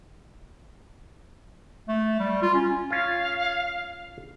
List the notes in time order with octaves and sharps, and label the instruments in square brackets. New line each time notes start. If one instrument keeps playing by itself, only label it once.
[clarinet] A3
G3
F4
C#4
[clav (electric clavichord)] C#4 F4 [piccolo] F5